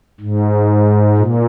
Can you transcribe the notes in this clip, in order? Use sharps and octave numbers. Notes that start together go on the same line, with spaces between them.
G#2
A#2